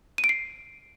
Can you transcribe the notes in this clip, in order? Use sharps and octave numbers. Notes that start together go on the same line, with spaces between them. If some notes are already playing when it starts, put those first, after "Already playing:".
D#7
D7
C7